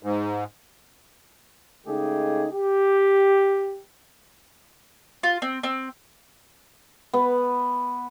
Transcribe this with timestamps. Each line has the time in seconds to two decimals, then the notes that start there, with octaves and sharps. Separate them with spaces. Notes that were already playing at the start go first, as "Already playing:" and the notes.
0.03 G#2
1.86 C#3 G#3 A3 D#4 G4 G#4
2.53 G4
5.23 F4
5.42 C4
5.63 C4
7.13 B3